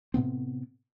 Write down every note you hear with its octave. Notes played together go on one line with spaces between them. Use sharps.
A2 C3 B3 C4